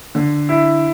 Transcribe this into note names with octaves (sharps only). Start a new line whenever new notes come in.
D3
E4